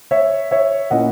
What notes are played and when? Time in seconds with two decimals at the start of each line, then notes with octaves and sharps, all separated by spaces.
0.11 C#5 E5
0.51 C#5 E5
0.90 A#2 A#3 C#4 E4 D#5 F#5